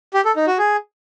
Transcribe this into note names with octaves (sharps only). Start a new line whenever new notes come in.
G4
A4
D#4
F#4
G#4